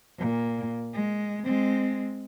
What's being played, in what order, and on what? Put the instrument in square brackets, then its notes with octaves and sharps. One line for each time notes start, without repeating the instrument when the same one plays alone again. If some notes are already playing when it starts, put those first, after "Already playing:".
[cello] A#2
G#3
G#3 C4